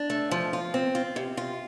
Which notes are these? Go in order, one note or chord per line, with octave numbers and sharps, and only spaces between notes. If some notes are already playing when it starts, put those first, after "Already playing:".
Already playing: D4
A3
F3
F4
C4
F4
C3
F4